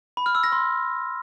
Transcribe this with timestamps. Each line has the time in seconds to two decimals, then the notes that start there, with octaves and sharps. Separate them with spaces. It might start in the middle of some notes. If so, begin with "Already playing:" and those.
0.17 B5
0.26 F6
0.35 E6
0.44 A#6
0.52 C6